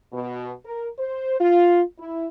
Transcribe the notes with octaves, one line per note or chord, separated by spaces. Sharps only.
B2
A#4
C5
F4
E4